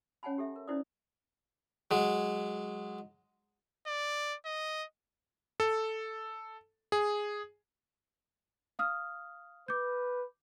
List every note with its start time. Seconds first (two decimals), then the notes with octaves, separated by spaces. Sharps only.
0.23 C#4 C#5 F#5 G#5 A5 B5
0.38 G4 A4 E5
0.56 A#4
0.68 C#4 D#4 E4 C5 D5 D#6
1.91 F#3 G#3
3.87 D5
4.46 D#5
5.60 A4
6.92 G#4
8.79 F5 D#6 F6
9.68 B4 D6 G6